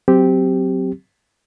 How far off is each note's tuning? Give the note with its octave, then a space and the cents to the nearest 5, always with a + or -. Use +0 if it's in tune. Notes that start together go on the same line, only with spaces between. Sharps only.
F#3 +0 C4 -10 G4 +0